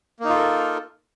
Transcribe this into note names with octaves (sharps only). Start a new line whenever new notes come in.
A#3 D#4 F4 A4 A#4